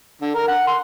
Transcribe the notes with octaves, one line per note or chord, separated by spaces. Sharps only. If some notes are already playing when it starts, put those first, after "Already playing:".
D3
A#4
F#5
C6